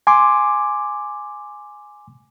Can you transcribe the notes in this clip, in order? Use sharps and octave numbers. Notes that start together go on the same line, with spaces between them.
G#5 C6 D6